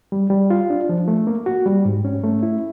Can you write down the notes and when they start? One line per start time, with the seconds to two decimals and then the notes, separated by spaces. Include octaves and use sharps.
0.12 G3
0.30 G3
0.50 F4
0.70 D4
0.89 F3
1.08 A3
1.27 A#3
1.46 F#4
1.66 G3
1.85 G#2
2.05 C#4
2.24 A3
2.43 E4